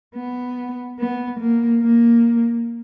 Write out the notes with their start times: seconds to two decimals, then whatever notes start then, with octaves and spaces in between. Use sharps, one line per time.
0.15 B3
0.99 B3
1.40 A#3
1.81 A#3